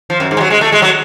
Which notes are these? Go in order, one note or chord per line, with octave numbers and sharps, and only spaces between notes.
F3
F#2
G#2
G#3
F#3
G#3
A3
G#3
F#3